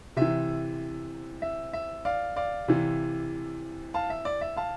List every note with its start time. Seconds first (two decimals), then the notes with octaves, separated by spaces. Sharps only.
0.17 C3 E3 E5
1.42 E5
1.73 E5
2.05 D5 F5
2.36 D5 F5
2.68 C3 E3
3.94 F5 A5
4.10 E5
4.25 D5
4.41 E5
4.57 F5 A5